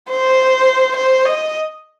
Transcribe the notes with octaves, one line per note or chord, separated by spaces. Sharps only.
C5
C5
D#5